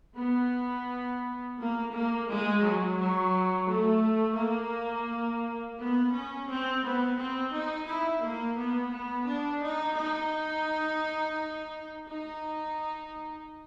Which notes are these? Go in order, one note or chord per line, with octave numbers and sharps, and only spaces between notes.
B3
A#3
A#3
G#3
F#3
F#3
A3
A#3
B3
C#4
C4
B3
C4
D#4
E4
A#3
B3
B3
D4
D#4
D#4
D#4